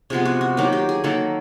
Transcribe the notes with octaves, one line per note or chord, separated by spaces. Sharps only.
C3 F3 G#3 B3 G#4
F#4
F#4
D#3 F#3 A#3 G4
G4
G#4
D#3 F#3 A#3 A4